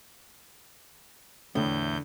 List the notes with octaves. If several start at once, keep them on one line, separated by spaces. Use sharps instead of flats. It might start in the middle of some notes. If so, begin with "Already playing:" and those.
E2 A2 D3 G6